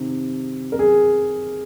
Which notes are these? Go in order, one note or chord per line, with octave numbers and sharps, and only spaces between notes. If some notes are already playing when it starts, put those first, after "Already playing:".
Already playing: C3 D#3
A#4
G#4